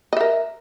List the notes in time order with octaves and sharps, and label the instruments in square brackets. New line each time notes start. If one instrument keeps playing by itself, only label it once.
[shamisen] D#5
E5
A#4